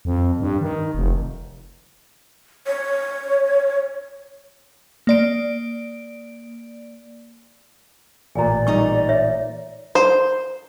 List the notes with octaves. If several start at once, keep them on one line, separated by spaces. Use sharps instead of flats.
F2
G2
D#3
F1
C#5
A#3 D5 D7
A1 A#2 D5 G#5 A#5
G3 D#4 D#5 C#6
C#5 E5
C5